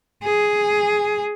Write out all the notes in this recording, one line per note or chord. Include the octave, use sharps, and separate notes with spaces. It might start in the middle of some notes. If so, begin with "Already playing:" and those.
G#4